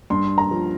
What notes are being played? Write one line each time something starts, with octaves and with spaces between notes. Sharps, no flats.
G2 C6
A#5
F3